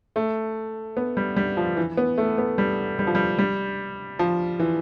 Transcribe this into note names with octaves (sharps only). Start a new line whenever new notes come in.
A3
B3
G3
G3
F3
E3
B3
A3
B3
G3
G3
F3
G3
G3
F3
E3